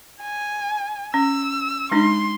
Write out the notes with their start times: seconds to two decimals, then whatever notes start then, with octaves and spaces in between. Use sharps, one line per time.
0.21 G#5
1.14 C#4 E6
1.91 G#3 D4 D#4 C6